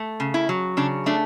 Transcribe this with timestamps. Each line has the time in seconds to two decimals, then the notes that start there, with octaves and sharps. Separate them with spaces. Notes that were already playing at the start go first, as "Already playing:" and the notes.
Already playing: A3
0.20 C#3
0.34 E4
0.49 F#3
0.77 C#3 D4
1.06 A3 D4